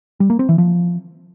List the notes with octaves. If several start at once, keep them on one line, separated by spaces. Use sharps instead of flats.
G3
A#3
C4
E3
F3